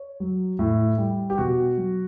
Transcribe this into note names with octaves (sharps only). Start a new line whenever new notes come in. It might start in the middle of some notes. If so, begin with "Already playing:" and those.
Already playing: C#5
F#3
A2
G3
G4
B2 F#4
F#3